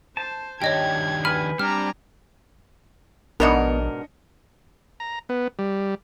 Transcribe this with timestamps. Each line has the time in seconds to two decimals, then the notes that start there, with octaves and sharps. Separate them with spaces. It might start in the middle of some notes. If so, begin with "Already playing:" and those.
0.17 C5 A5
0.62 D#3 D4 G4 C#5 D#5 G5 G#6
1.25 B4 G#5 B5 F6
1.59 G3 C4 D4 G#5 A#5 F6
3.40 A#1 G#2 B2 B3 D4 A#4 D#5 C#7
5.00 A#5
5.29 B3
5.59 G3